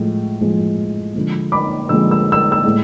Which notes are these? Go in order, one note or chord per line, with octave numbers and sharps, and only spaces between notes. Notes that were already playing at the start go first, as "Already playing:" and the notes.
Already playing: A2 F3 G#3
A2 F3 G#3
D3 F3 G#3
B5 D6
D3 F3 G#3 E6
E6
E6
E6
A2 G#3